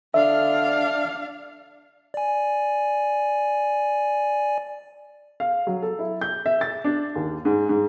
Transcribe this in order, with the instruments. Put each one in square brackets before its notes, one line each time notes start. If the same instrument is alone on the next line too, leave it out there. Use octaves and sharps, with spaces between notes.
[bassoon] D3 [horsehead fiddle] D4 F5 [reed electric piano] E5
[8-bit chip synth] D5 G#5
[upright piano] F5
F#3
A4
E4
G6
E5
A6
D4
D#2
G#2
G#2